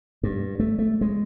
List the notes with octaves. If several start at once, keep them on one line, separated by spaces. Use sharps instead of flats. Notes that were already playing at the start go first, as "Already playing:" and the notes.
G2
A3
A3
G#3